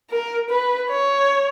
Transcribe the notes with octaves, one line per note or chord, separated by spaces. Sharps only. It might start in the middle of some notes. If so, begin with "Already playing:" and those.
A#4
B4
C#5